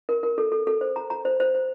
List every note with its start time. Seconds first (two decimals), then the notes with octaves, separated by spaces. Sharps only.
0.09 A#4
0.23 A#4
0.38 A4
0.52 A4
0.67 A4
0.81 C5
0.96 A#5
1.10 A#5
1.25 C5
1.40 C5
1.55 C5